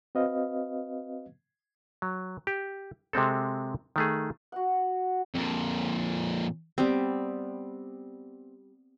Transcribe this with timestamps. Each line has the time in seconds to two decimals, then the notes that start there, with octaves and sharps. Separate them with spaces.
0.15 C4 F#4 B4 D#5 F5
2.02 F#3
2.47 G4
3.13 C3 G#3 C4 A4
3.96 D#3 A3 G#4
4.52 F#4 F#5
5.34 F2 A#2
6.78 G3 B3 C4